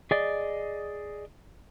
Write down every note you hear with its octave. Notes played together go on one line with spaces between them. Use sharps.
G#4 D5 D#5